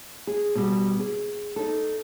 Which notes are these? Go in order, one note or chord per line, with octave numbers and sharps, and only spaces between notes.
G#4
B2 G3
G#4
D#4 A4